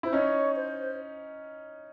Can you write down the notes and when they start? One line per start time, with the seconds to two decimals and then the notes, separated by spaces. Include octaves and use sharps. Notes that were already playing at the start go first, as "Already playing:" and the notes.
0.03 E4 C5
0.13 C#4 D#4 C#5
0.56 C5